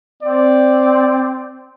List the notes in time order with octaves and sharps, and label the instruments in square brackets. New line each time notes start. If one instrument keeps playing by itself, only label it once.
[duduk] C4 [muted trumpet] D5